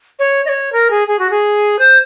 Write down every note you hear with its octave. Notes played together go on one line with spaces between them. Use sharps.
C#5
D#5
C#5
A#4
G#4
G#4
F#4
G#4
C5